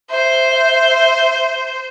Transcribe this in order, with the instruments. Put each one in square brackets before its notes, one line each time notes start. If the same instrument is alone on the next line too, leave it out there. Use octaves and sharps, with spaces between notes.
[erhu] C5 [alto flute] E5